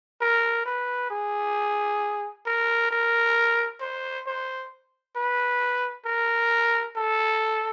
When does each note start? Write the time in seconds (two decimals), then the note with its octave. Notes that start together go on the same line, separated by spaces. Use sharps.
0.21 A#4
0.65 B4
1.10 G#4
2.46 A#4
2.91 A#4
3.81 C5
4.27 C5
5.16 B4
6.05 A#4
6.96 A4